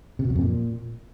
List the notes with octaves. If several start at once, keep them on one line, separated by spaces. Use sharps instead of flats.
C3
B2
E2
F2
A#2